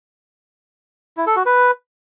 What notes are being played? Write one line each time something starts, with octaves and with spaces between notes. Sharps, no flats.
E4
A4
F#4
B4